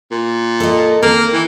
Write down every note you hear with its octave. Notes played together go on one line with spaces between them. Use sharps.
A#2
A4 D#5
D#3 A#3 C4
E3